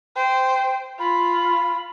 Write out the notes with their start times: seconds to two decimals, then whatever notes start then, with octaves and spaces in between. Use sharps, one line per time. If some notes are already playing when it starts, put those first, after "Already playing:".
0.16 C5 G5
1.00 F4 B5